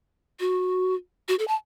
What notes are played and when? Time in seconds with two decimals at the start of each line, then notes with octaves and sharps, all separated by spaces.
0.40 F#4
1.28 F#4
1.39 A4
1.48 A5